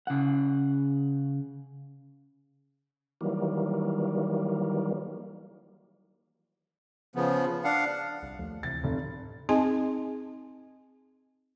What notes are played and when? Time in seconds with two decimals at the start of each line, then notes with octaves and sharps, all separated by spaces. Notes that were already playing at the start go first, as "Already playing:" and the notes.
0.07 C#3 F#5
3.21 D#3 E3 F#3 G3 A#3
7.16 C#3 F3 B3
7.64 D4 F5 F#5
8.22 C2
8.39 D#2 F3 A3
8.63 D2 C3 E3 A6
8.84 F1
9.49 C4 D#4 G#4 D#5 G#5 A5